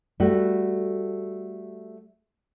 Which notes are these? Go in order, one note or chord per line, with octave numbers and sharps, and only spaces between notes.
G3 A3 F#4